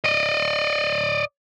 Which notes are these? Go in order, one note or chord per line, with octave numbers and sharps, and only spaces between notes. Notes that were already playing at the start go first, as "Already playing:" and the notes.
D5 D#5